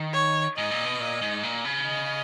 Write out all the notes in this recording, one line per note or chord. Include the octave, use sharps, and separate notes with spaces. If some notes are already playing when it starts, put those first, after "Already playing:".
Already playing: D#3
C#5
G#2 D#5
A#2
B2
A#2
G#2
A#2
C#3
D#5